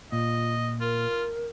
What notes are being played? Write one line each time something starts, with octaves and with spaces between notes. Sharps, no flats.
A#2 F4 D#5
F4 A#4